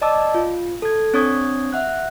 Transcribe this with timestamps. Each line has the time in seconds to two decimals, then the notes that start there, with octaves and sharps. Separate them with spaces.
0.01 D5 D#5 A5 D6 E6
0.34 F4
0.82 A4 G#6
1.13 C4 D4 C#5 C#6 D#6 G#6
1.73 E5 F#5 F#6